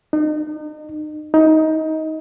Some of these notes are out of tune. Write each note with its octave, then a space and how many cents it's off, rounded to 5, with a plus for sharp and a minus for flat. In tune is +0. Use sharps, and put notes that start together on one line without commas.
D#4 -35
D#4 +20